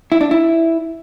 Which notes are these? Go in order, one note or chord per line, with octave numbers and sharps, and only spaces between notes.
E4
D4
E4